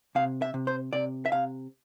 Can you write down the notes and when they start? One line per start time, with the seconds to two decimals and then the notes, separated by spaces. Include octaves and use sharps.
0.15 C3 F5
0.42 E5
0.54 C3
0.67 C5
0.93 C3 D5
1.26 E5
1.32 C3 F5